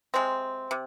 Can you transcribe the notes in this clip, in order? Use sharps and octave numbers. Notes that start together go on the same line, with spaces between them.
C3 G#3 C4
C3